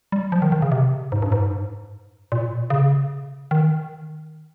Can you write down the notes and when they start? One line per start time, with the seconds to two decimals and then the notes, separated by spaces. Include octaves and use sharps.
0.12 G3
0.32 F3
0.42 D#3
0.52 D#3
0.62 C#3
0.72 C3
1.12 G#2
1.22 G2
1.32 G#2
2.32 A#2
2.70 C#3
3.51 D#3